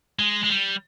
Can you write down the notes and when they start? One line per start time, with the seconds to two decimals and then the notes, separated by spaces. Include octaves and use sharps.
0.19 G#3
0.44 G#3
0.49 G3